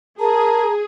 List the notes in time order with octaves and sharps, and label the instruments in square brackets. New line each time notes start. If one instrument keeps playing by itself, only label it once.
[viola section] G#4 [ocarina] A#4 [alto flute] A5 [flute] A#5